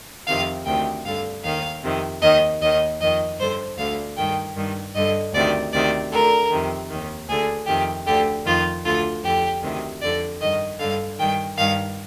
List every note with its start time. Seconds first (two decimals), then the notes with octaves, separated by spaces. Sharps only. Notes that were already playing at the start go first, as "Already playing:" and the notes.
0.26 F2 C3 D#3 F5
0.65 D2 C3 D#3 G5
1.04 G2 D3 F5
1.43 D#2 D#3 F5
1.82 F2 C3 D#3
2.21 D#2 D#3 D#5
2.60 D#2 D#3 D#5
2.99 F2 D#3 D#5
3.38 G2 D3 C5
3.77 D2 D3 F5
4.16 G2 D#3 G5
4.55 G2 D#3
4.94 G2 D3 D#5
5.33 D2 C3 D#3 D5
5.72 D2 C3 D#3 D5
6.11 D2 D3 A#4
6.50 F2 C3 D#3
6.89 D#2 D#3
7.28 D2 D3 G#4
7.66 F2 C3 D#3 G4
8.06 D2 D3 G4
8.45 F2 D#3 F4
8.84 D2 D3 F4
9.22 F2 D3 G4
9.62 D2 C3 D#3
10.01 F2 D3 D5
10.40 G2 D#3 D#5
10.78 G2 D3 F5
11.18 G2 D#3 G5
11.56 G2 D#3 F5